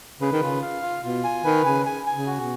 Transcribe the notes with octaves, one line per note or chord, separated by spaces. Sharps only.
C#3 B4
D#3
C#3 F4
F5
F4
B2 F4
G#5
D#3 B4
C#3 G#5
G#5
G#5
C#3
F#4
B2